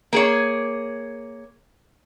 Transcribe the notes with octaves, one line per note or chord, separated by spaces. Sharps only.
A#3 G#4 C#5